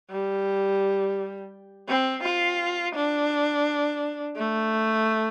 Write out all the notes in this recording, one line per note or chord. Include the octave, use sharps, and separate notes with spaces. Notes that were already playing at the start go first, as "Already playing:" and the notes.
G3
C4
F4
D4
A3